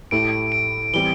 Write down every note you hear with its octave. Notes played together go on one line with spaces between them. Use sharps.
A2 A3 E4 G4 D7
D7
E3 G3 C4 G7